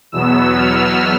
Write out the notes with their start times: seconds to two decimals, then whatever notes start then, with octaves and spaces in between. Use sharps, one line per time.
0.12 E2 B2 F#3 B3 E6
0.57 F6